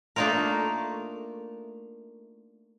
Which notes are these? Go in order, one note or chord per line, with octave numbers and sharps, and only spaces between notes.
A3 A#3 D4 D#4 F4 A#4